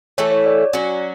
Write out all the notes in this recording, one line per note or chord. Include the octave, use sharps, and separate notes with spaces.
E3 A3 E4 A4 C#5
C#5
D5
F#3 C#4 F#4